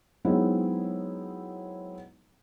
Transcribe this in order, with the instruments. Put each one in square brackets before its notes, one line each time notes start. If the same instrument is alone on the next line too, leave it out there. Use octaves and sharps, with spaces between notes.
[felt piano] F#3 G#3 B3 C4 D#4 E4